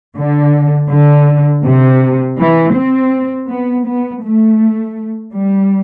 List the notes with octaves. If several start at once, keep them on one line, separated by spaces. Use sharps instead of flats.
D3
D3
C3
E3
C4
B3
B3
A3
G3